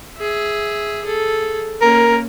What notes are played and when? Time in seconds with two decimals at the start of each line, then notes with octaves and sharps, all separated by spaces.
0.18 G#4 E5
1.05 G#4 A4
1.81 A#3 C#4 A#4